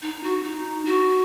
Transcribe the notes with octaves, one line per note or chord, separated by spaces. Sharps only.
D#4
F#4
D#4
F#4